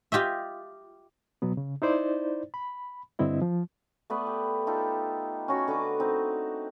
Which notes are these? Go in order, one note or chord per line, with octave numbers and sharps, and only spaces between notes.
F4 G4 D#5 E5
B2 F#3 B3
C#3
D#4 E4 C5 D5
B5
G2 D3 C4 E4 D#5
F3
A3 B3 B4 D5
G4
D#4 F4 G4 A4
C#4 F#4 C#5
D3 B4 D#5 D6
C4 D#4